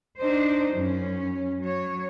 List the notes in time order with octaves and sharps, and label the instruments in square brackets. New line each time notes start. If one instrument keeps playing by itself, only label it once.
[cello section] D4 D#4 C5
F#2 C#4
F#3 C#5